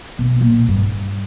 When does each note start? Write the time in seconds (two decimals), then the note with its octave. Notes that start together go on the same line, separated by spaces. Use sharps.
0.18 B2
0.41 A#2
0.68 G2